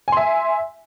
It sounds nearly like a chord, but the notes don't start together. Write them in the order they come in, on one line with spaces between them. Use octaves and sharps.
G#5 C6 E5